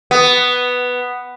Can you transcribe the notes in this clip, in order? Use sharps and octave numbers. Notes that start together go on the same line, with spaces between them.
B3